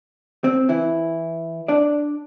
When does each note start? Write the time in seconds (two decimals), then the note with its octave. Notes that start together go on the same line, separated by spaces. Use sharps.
0.44 C4
0.69 E3 E4
1.68 D4 D5